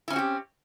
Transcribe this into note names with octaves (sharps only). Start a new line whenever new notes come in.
C4 C#4 E4 F#4 G4